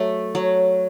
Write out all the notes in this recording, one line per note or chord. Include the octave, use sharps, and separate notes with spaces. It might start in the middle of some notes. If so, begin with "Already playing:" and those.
Already playing: F#3 A3
F#3